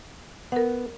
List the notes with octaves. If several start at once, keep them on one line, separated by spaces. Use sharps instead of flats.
B3 A#4 F#5